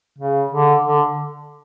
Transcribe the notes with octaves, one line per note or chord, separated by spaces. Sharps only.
C#3
D3
D3